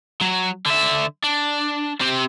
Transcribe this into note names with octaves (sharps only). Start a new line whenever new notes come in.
F#3
D3 E5
D4
C4 G4